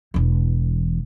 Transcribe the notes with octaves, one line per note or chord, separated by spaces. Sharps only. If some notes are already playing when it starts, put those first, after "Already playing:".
E1 E3